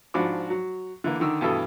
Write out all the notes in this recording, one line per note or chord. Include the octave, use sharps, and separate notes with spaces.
G#2 F3 D4 F#4 B5 D6
F#3
D3 E3 A#3
D3 D#3 E6
G2 B2 E3 A4 D#6